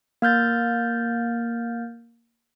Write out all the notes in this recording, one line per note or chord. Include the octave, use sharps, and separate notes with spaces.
A#3 F6 G6 A6